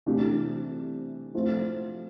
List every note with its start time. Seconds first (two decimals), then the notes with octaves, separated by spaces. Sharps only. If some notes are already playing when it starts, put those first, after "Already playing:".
0.06 C3 E3 A3 D4 G4
1.35 F3 A3 C4